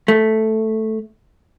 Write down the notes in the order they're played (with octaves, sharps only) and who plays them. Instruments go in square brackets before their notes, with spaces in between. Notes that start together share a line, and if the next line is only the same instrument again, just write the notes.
[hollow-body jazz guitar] A3